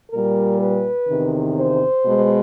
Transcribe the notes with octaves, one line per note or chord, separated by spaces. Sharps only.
A#2 G3 A#4
B4
E2 C3 D#3
C5
B2 G#3